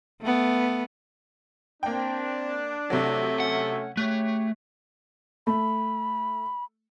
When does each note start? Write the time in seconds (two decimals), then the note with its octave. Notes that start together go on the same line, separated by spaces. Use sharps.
0.21 A3 B3
1.83 A#3 C4 D4 G5
2.90 C3 F#3 A3
3.40 C#4 F#5
3.97 C#3 A3 G4 C#5 F#6
5.47 A3 B5